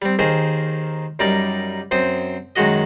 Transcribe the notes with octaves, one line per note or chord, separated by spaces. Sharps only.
G3 C4
D#2 D#3 G#4 A#4 C5
F#2 G3 D#4 A#4 D5
F#2 C4 C5 D#6
F#2 D#3 G#3 F#4 D#5